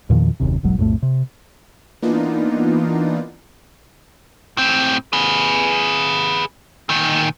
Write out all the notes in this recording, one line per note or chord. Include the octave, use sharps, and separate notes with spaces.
E2 A#2 D#3 F3
F#1 D#2 C3
E1 B1 G#2 F#3
B1 F2 A2 A3
C3
E3 A#3 B3 D4 D#4 F4
A2 C4
G#4 B4
A#2 D#3